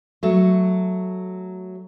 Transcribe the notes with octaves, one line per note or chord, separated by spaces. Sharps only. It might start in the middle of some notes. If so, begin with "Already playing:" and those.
F#3 A3